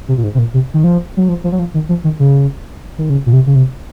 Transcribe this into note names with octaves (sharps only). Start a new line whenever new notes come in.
C3
A#2
G#2
C3
A#2
C3
D#3
F3
F#3
F3
F3
F#3
F3
D#3
F3
D#3
C#3
D#3
C#3
A#2
C3
C#3
C3